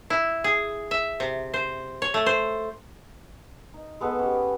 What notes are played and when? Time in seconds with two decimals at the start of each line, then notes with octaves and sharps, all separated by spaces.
0.10 E4
0.44 G#4
0.91 E5
1.20 C3
1.54 C5
2.02 C#5
2.14 A3
2.26 C5
3.74 D#4
4.00 G#3 B3 A4 B4
4.19 C#4 G4